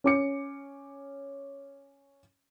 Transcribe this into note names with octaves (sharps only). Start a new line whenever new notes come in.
C#4 D6 C#7